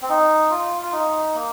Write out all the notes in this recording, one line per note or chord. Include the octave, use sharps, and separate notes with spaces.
C4
D#4
F4
F4
D#4
A#3